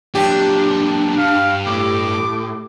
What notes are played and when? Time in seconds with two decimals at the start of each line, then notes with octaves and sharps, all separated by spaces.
0.15 A#2 F#3 D4 G4
1.18 G2 F5
1.67 A2 D6